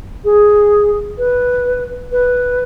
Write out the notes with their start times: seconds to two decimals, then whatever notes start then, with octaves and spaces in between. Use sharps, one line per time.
0.25 G#4
1.18 B4
2.12 B4